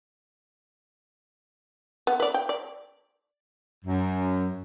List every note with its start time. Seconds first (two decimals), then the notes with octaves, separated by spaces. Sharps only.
2.07 B3
2.20 B4 D5
2.34 G5
2.49 D5
3.85 F#2